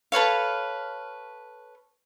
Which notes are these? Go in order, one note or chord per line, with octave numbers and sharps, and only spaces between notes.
A4 B4 C#5 F5